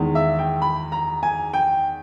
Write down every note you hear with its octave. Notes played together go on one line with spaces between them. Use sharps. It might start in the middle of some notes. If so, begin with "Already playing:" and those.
Already playing: E2 D#3 G#3
E5
G5
B5
A#5
G#5
G5